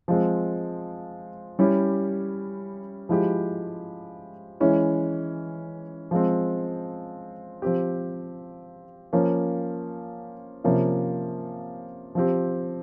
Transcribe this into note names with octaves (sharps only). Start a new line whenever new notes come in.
F3 G#3 C4
G3 C#4 E4 G4
F3 G#3 E4 G4
E3 G#3 C#4 E4
F3 G#3 C4
F3 C4 G4
F3 A#3 C#4
C3 F3 A#3 C#4
F3 C4 G4